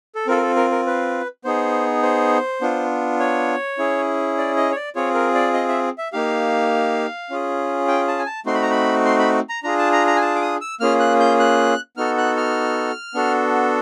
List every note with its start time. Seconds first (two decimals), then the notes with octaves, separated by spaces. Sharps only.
0.15 A4
0.27 C4 F4 A4 A#4
0.37 A#4
0.41 A4
0.56 A#4
0.71 A#4
0.87 B4
1.45 B3 D#4 G#4 C5
2.02 C5
2.61 B3 D4 F4
3.20 C#5
3.78 C#4 E4 G#4
4.38 D5
4.57 D#5
4.71 C#5
4.76 D5
4.95 C4 F4 G#4 C#5
5.14 A#4
5.35 D5
5.54 D#5
5.69 E5
5.98 E5
6.13 A#3 D#4 G4 F5
7.30 C#4 F4 G#4
7.88 G5
8.08 A5
8.19 G#5
8.26 A5
8.46 A3 C4 D#4 F#4 C6
8.54 B5
8.62 A#5
8.71 B5
9.05 C6
9.19 B5
9.49 A#5
9.63 D4 F4 G#4 A#5
9.78 A5
9.92 A#5
10.07 A#5
10.16 G#5
10.21 A5
10.35 D6
10.41 D#6
10.61 E6
10.80 A#3 C#4 F4 G#4 F6
11.00 F#6
11.20 G6
11.40 F#6
11.97 B3 D#4 F#4 A4 F6
12.18 F#6
12.37 F6
13.14 B3 D4 F#4 A4